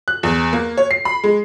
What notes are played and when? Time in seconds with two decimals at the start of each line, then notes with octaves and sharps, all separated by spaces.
0.08 F#6
0.23 E2
0.53 A#3
0.77 C#5
0.91 C7
1.05 B5
1.24 G#3